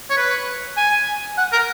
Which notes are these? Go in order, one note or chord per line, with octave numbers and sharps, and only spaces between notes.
C#5
B4
G#5
F#5
A#4